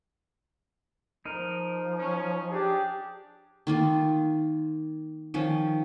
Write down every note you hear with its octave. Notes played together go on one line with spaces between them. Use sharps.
F3 D#4 A#4
C#4
D4 G4 G#4
D#3 A#3 F4
D#3 F3 C#4